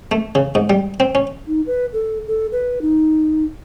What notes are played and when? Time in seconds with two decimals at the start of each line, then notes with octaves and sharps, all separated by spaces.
0.12 A3
0.35 C#3
0.55 G#2
0.70 G3
1.00 C4
1.15 C#4
1.48 D#4
1.66 B4
1.93 A4
2.27 A4
2.52 B4
2.82 D#4